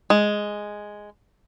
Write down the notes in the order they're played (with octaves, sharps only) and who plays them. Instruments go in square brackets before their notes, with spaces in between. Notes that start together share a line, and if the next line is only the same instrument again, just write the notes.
[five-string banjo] G#3